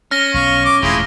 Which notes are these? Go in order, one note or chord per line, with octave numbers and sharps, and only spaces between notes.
C#4 F6 A#6 G7
B1 B2 F5 C#6
D6
E1 A2 E4 F4 G#4